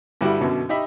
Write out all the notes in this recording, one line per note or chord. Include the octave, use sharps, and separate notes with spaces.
G2 D3 G3 E4 F#4 G4
F#2 B2 D3
D#4 G4 D#5 E5 B5